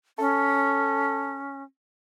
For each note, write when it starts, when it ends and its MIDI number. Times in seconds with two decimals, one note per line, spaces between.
0.19 1.63 61
0.19 1.40 69